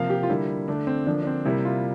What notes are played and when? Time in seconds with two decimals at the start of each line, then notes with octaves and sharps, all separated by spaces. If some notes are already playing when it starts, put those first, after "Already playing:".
Already playing: C3 F3 A#3 F5
0.10 G4
0.23 F4
0.29 D3 G3 A#3 E4
0.68 D3 A3 D4
0.87 C4
1.07 D3 F3 A#3 D4
1.22 D4
1.27 C4
1.45 C3 G3 A#3 E4
1.65 F4